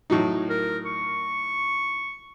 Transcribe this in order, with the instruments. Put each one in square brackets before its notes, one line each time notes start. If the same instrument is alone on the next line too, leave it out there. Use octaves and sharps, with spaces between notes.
[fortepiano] A2 F#3 D#4
[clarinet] A#4
C#6